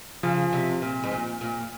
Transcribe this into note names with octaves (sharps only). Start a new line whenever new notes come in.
C#3 F3
C3
A#2
G#2
A#2
A#2